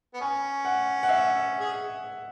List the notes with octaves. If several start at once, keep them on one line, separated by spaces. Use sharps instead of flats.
B3
C#4 G#5
F#5
F#5
E5
G#4